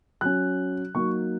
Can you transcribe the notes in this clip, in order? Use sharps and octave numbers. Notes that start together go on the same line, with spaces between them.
F#3 C#4 F#6
F#3 A#3 D#4 C#6